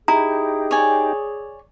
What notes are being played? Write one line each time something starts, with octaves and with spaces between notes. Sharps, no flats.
D#4 E4 G4 G#4 A#5
C#5 D5 G#5